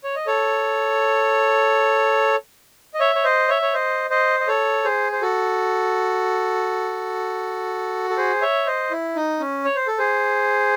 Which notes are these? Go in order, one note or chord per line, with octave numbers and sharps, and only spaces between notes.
C#5
D#5
A4 C#5
D#5
C#5 E5
C#5
C5 D#5
C#5 E5
C#5
C5 D#5
C5 D#5
D#5
A4 C#5
G#4 C5
C5
F#4 A4
A4
G#4 C5
C#5 E5
C5 D#5
E4
D#4
C#4
C#5
C5
A4
G#4 C5